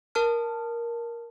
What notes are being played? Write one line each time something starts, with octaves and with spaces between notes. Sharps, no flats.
A#4 A5 F6